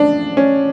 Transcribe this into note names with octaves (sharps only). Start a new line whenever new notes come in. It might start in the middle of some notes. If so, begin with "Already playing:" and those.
Already playing: F2 C#3 D4
C#4